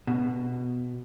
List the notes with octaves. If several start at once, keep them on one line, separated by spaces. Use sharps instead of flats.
B2